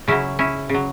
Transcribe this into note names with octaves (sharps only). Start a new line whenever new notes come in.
C#3 F#3 C#4 E4
C#4 E4
C#3 F#3